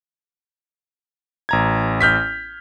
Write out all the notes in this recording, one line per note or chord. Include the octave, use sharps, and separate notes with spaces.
A1 A#5 G#6
F6 G6 B6